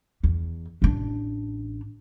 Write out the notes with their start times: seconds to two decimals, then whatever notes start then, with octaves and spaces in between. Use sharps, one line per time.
0.24 E2
0.82 A1 D4